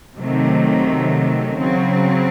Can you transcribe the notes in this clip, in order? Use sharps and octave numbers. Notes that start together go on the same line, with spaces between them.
C3 D#3 F#3 A3
C#3 F#3 C4